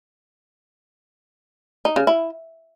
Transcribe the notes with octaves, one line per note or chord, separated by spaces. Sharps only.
D#4
C#3
E4